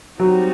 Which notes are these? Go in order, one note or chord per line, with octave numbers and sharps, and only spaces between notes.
F#3 G3 C4 D#4 F#4